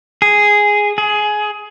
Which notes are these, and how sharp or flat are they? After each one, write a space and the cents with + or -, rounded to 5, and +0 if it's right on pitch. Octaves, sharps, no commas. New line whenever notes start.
G#4 -5
G#4 +15